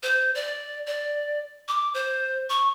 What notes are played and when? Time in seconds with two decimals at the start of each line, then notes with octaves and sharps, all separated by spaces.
0.03 C5
0.35 D5
0.87 D5
1.68 D6
1.94 C5
2.50 C#6